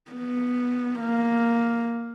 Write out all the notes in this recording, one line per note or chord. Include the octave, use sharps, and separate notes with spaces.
B3
A#3